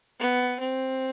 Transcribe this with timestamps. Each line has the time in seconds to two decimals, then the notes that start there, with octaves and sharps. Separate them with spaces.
0.19 B3
0.60 C4